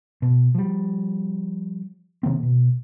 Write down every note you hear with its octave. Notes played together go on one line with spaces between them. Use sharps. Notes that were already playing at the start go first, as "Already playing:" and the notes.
B2
F3 G3
C3 D#3 A#3 C4
B2